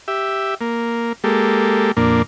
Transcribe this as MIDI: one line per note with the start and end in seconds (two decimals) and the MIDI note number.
0.08 0.55 67
0.08 0.55 76
0.61 1.13 58
1.24 1.92 56
1.24 1.92 58
1.24 1.92 67
1.24 1.92 69
1.97 2.22 41
1.97 2.22 46
1.97 2.22 58
1.97 2.22 62